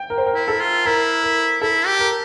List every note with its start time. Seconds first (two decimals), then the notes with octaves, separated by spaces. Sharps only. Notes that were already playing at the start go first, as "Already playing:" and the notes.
Already playing: G5
0.10 A#4
0.18 C5
0.26 A#4
0.35 E4
0.48 A4
0.60 F4
0.86 E4 A#4
1.24 A#4
1.61 E4 A4
1.86 G4
1.99 A#4